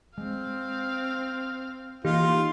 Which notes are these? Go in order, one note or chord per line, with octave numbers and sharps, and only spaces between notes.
G#3 C4 F5
E3 A#3 D#4 F4 G4